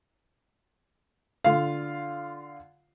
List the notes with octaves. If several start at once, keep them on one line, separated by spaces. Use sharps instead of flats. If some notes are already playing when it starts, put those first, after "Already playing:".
D3 F4 F5